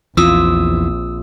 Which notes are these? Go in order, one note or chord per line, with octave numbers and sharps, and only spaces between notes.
A#1 E2 E3 C4 F4 D#6 E6